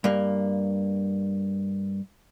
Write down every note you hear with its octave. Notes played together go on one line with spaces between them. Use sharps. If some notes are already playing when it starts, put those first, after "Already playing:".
G2 A#3